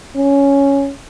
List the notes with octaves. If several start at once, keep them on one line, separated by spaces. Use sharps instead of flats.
C#4